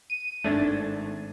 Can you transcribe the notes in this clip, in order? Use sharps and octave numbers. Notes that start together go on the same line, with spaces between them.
D#7
G#1 A3 D4 G#6 A6